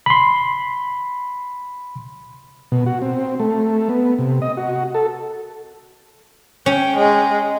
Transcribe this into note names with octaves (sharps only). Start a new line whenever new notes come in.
B5 C6
B2
F#4
C4
A3
B3
C3
D#5
F#4
A4
C#4 G5
G#3